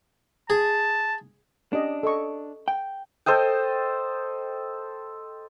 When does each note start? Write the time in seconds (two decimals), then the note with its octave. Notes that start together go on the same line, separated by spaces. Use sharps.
0.50 G#4 A5
1.73 C#4 D4 G4 D#5
2.03 A4 D#5 C#6
2.68 G5
3.26 A4 C5 D#5 G5